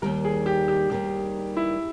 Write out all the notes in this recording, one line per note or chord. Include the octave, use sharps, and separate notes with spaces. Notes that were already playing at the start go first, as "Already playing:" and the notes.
D#2 D#3 G3 A#4
G#4
G4
G4
D#2 D#3 G3 G4
E4